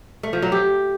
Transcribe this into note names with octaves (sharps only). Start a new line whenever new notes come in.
A3
F3
F#3
G4